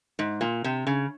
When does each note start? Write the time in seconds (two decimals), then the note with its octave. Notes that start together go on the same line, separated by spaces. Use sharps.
0.19 G#2
0.41 A#2
0.64 C3
0.87 C#3